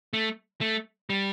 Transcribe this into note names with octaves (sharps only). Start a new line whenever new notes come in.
A3
A3
G3